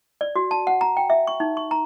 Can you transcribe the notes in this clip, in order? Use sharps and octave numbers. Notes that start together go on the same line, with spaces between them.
D5
F#4
A5
F#5
A#5
G5
E5
C#6
D#4
C#6
A#5